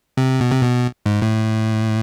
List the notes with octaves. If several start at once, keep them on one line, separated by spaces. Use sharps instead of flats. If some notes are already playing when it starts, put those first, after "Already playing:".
C3
B2
C3
B2
G#2
A2